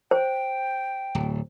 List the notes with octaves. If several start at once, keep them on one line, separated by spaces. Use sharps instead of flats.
C5 G5
D1